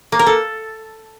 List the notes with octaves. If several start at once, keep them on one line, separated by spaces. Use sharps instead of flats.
A#3
A#4
A4